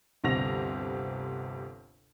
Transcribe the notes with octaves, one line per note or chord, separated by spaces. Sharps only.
G1 D2 C3 C4 A#6 F7